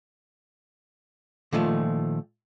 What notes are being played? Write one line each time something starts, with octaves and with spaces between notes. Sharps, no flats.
A#2 D#3 F3 A3